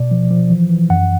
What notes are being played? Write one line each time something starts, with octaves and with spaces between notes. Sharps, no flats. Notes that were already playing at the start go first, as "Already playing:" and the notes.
Already playing: B2 D5
F3
F3
E3
E3
F#2 F#5